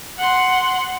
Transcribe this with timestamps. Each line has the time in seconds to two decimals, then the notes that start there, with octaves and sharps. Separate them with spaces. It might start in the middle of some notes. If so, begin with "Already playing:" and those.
0.18 F#5 C6